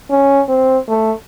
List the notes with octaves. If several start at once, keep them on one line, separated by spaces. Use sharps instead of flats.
C#4
C4
A3